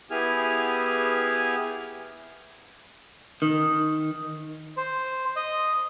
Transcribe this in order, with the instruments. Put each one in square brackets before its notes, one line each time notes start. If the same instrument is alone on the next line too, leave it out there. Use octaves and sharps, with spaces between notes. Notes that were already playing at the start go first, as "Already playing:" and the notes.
[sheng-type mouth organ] B3 E4 G4 G#4 G#5 F6
[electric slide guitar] D#3
[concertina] C5
D#5